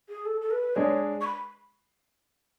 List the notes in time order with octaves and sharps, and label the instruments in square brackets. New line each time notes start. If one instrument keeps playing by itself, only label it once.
[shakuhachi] G#4
A4
A4
B4
[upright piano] G#3 D4 G#4 [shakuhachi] C#5
[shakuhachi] C#6
B5